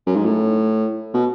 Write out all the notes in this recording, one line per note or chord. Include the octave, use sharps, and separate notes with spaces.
F#2
G#2
A2
B2